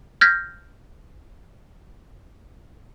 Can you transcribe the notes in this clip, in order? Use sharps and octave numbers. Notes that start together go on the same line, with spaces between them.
F6 G6 G#6 A#6 B6